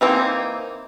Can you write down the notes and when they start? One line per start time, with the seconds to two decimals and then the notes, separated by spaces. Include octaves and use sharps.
0.01 E3 A#3 C4 D#4